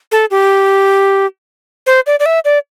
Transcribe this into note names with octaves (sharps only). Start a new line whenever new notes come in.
A4
G4
C5
D5
D5
E5
D5